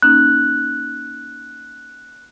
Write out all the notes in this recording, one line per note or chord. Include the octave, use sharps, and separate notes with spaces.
A#3 C#4 D#4 F#6